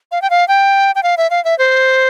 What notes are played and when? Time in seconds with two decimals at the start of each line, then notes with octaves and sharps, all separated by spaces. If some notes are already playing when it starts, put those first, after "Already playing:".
0.12 F5
0.22 G5
0.30 F5
0.48 G5
0.95 G5
1.03 F5
1.17 E5
1.30 F5
1.45 E5
1.59 C5